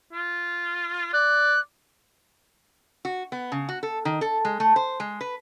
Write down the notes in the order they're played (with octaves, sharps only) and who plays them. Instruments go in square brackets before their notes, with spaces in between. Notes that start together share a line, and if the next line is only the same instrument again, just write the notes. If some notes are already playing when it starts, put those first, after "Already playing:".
[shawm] F4
[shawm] D5 [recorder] F#6
[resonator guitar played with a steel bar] F#4
B3
C#3
F#4
A4
D#3
A4
G#3
A3
C5
G#3
B4